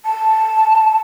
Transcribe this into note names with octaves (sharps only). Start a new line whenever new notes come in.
A5